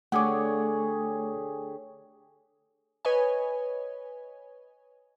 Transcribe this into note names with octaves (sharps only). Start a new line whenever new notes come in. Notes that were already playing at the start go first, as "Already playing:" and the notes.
D3 A3 G4 G#4 C#5 F#5 D6
B4 C#5 D#5 G#5